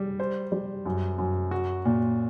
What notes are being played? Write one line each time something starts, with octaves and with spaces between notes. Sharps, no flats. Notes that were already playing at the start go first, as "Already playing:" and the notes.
Already playing: G3
C5
G3
F#2
F#2
F#4
A#2